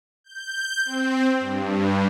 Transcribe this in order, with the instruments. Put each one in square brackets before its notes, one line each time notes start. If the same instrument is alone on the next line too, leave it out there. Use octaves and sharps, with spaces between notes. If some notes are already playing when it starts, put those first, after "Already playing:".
[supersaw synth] G6
C4
G2